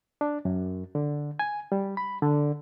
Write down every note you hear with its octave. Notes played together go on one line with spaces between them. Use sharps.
D4
F#2
D3
G#5
G3
B5
D3